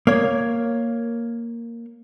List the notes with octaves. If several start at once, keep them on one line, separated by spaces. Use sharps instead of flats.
A#3 C#5